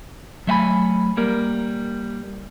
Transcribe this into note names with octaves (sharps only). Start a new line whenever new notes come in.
F#3 A3 E5 F5 G#5 B5
G3 A#3 A#4